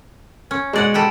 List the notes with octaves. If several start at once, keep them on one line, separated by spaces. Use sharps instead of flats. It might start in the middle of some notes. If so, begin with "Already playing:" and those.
C#4
B2 G#3 D5 F#5
G3 G4 A4